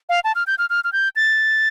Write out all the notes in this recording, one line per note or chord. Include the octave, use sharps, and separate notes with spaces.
F5
A5
F6
G6
F6
F6
F6
G6
A6